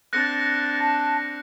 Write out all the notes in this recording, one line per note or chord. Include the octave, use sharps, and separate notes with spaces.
C4 D4 F#6 A6 A#6 C#7
A5